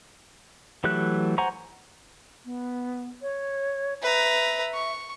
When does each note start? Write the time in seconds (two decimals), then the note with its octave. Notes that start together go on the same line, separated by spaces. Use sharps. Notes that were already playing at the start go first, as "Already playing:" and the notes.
0.84 E3 F#3 A3 G4 F#6
1.38 C5 F#5 G#5 A#5 C#6
2.45 B3
3.22 C#5
4.02 B4 E5 A#5
4.74 C#6